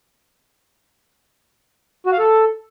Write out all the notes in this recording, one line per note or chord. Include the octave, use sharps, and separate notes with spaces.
F#4
F5
A4